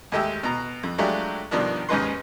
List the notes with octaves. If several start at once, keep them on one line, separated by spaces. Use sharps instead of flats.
D#2 G#3 A3 G4 E5
B2 A#5
F2
F#3 G#3 A3 D4 F4 G4
G2 B2 D#3 F3 G3 D4
D#2 G#2 C#4 D#4 B4 C6